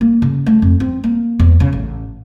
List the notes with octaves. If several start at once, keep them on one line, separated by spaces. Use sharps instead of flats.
A#3
C#3
A3
F2
C4
A#3
E2
C#3
A1